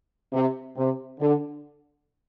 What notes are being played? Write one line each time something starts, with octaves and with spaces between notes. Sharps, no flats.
C3
C3
D3